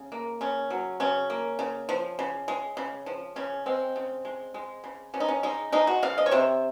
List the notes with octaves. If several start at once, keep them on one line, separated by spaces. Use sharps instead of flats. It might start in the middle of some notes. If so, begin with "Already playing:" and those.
Already playing: C#3
A#3
C#3 C#4
F#3
C#3 C#4
A#3
C#3
F3
C#3
G#3
C#3
F3
C#3 C#4
G#3 C4
C#3
G#3
G#3
C#3
C#3 C#4
D#4
C#4
G#3 D#4
G#3 D#4
F#4
C#3 F5
D#5
C#5
C3 C5